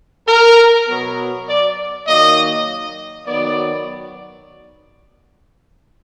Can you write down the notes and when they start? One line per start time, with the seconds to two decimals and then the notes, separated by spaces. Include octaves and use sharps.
0.27 A#4
0.87 B2 F#3 B3
1.47 D5
2.07 D#3 F#3 A#3 D#5
3.26 D#3 F#3 B3 D5